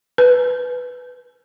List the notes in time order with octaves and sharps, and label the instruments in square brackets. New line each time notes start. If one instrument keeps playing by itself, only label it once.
[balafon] B4